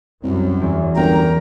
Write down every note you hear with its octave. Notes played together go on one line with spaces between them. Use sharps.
C2 F#2
E2
G1 A#4 G5 A#5